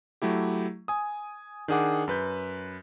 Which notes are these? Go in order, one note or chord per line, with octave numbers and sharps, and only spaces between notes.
F#3 A3 E4 G4
G#5 D#6
D#3 D4 G#4 F#5 D6
F#2 B4 G6